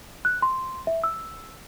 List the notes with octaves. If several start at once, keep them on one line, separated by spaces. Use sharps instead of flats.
F#6
C6
E5
E6